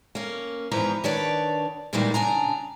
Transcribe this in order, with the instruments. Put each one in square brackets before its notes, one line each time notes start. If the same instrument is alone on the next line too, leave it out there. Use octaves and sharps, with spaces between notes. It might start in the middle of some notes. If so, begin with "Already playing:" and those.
[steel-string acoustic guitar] A#3 C#4
E2 G#2 E3 F3 B4 A#5
D#3 D4 B4 C#5 D5
A#2 D#3 E3 G3 G#3 A#3
C#3 D4 G#5 A#5